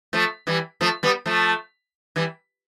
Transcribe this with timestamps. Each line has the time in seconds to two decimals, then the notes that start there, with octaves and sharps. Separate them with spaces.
0.13 F3 A3
0.47 E3 G3
0.81 F3 A3
1.03 G3 B3
1.26 F3 A3
2.16 E3 G3